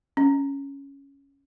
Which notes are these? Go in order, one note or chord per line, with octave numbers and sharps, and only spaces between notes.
C#4